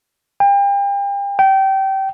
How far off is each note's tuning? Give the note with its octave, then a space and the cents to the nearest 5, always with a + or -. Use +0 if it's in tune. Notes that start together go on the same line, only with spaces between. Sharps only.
G5 +35
G5 -25